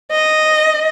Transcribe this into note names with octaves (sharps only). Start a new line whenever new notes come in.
D#5